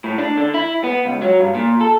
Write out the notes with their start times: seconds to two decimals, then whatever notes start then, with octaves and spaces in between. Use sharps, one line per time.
0.04 A2
0.18 D4
0.37 D3
0.54 E4
0.84 B3
1.05 C#2
1.22 F#3
1.40 G2
1.55 A#2
1.81 A4